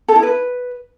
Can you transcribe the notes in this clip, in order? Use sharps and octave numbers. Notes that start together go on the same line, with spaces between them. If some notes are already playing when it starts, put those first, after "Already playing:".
A4
E4
B4